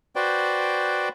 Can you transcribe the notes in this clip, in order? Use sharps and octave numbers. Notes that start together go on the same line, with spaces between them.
F#4 B4 C5 D5 G5